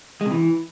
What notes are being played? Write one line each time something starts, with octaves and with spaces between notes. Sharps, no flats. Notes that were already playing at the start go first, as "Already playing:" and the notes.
G#3
C3
E3